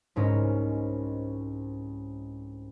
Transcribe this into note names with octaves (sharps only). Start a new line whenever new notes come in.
C2 G#2 C#4 A#4 D#5